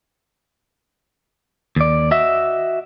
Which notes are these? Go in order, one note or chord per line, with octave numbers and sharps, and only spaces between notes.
D#2 D5
F#4 D#5 E5